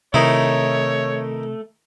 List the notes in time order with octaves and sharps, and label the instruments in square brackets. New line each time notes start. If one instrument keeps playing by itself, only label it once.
[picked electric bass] C3 [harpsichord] D#3 D#4 E4 [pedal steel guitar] A3 [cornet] C#5